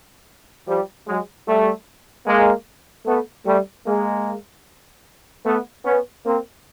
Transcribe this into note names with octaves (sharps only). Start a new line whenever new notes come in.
F3 G3
F#3 G#3
G3 A3
G#3 A#3
A3 B3
G3 A3
G#3 A#3
A3 B3
B3 C#4
A#3 C4